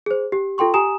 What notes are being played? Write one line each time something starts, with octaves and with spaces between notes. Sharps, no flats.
G#4 C5
G4
F4 A4 G5 C6 C#6
G4 G#5 A#5 D#6 E7